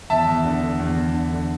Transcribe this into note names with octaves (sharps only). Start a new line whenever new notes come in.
E2 E5 A5
E2
D3
D3
E2
E2
D3
D3